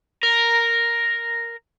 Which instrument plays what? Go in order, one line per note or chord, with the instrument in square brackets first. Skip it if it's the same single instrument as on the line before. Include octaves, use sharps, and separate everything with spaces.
[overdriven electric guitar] A#4